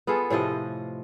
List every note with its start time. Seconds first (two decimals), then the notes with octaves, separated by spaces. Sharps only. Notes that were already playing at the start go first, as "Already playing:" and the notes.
0.07 B3 F4 G#4 A4
0.30 A2 C3 F3 D#5